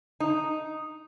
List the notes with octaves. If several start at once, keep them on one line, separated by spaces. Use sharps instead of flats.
D#4